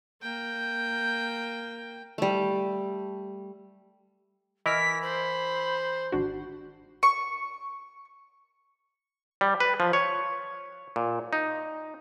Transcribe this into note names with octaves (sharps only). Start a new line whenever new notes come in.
A#3 G5
G3 A3
E3 E4 A#4 D#5 F6 B6
C5 B5
G#1 D4 F#4
C#6
G3
B4
F3
C#5
A#2
D#4